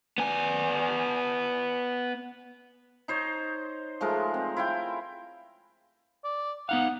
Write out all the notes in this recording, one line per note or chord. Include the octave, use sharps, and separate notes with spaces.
B3 G#5
D#4 C5 C#5
F3 G#3 A3 A#4
C4
E4 F5 G5
D5
B3 D#4 F5 F#5